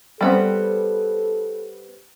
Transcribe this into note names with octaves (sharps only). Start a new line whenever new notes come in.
G3 B3 C4 A4